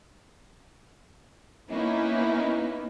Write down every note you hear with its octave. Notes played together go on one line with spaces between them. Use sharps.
A#3 B3 C#4 D#4 E4